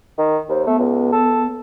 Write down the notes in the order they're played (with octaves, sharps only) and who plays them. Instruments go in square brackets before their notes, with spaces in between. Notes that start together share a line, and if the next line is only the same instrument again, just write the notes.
[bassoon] D#3
[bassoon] D#2 [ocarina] C5
[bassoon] A3 [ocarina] B3
[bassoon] C#2
A4